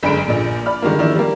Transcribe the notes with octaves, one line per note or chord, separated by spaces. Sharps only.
G1 F#2 D3 G#3 B5 D7
A#1 A#2
D5 B5 F6
D3 D#3 G3 G#3 A#3
D#3 F3 D4 E4
G3 A#3